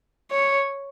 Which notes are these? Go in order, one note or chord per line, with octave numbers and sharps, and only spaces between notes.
C#5